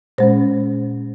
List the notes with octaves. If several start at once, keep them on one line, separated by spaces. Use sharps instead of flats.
A#2 G#3 C#4 C5